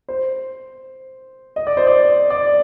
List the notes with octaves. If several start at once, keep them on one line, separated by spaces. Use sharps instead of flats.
C5
D#5
D5
C5
D5
D5